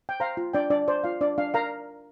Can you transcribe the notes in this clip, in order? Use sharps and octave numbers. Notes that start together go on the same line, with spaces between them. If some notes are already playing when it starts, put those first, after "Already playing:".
G5
C5 F5 A#5
F4
D4 D5 G5
D4 D5
C5 D5
F4 F5
D4 D5
D4 F5
A#4 F5 A#5